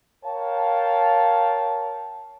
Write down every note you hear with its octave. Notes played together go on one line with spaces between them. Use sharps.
A#4 C#5 F5 G5 A5